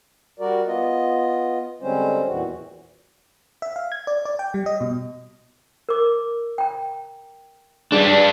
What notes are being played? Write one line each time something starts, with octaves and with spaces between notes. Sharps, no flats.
G3 F#4 A#4 D5
B3 F4 D#5
D3 G3 G#3 C4 C#4 C5
E2 A#2 E3 F#4
E5
F5
G#6
D5
D5
G5
G3
D#5
B2
A#4 D6
G5 A#5
G3 D4 G#4